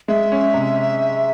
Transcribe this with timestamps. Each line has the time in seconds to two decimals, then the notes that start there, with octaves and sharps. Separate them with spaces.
0.08 G#3 E5
0.32 C#4
0.54 C3